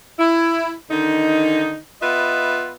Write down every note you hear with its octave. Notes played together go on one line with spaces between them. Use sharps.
E4
D3 D#3 D#4
B3 F4 B4 D#5 E5